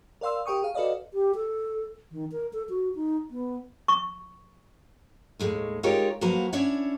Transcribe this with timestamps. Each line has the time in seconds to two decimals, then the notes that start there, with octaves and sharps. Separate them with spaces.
0.21 A#4 D5 F5 C6 E6
0.46 G4 A#4 G5 C#6 D#6
0.62 G#4 F5
0.75 F#4 A4 B4 D5 D#5 F5
1.14 G4
1.35 A4
2.11 D#3
2.32 A#4
2.53 A4
2.69 F#4
2.95 D#4
3.31 B3
3.88 C#6
5.39 D#2 A2 G#3
5.83 G#3 D#4 F4 G4 A#4 C#5
6.21 F3 F#3 A#3 F#4 B4 A#5
6.53 C#4 D4 E4 C#5 E5 F#5